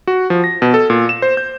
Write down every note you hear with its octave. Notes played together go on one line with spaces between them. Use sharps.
F#4
F3
A#6
B2
A4
A#2
E7
C5
G6